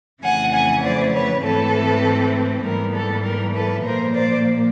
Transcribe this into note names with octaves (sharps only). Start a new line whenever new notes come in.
F2 C#3 E3 A3 F#5 G#5
F#5 G#5
C5 D5
B4 C#5
G#2 E3 A3 C4 A4 B4
G#2 E3 G3 B3 A#4
A4
A#4
A4 B4
A#2 F3 A#3 A#4 C5
C5 D5